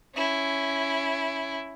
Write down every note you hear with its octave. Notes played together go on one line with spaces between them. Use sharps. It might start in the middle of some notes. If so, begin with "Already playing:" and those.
C#4 E4